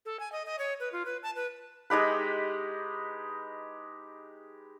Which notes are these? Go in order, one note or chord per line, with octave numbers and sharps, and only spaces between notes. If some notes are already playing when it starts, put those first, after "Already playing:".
A4
G#5
D#5
D#5
C#5
B4
F4
B4
A5
B4
G#3 D#4 G4 B4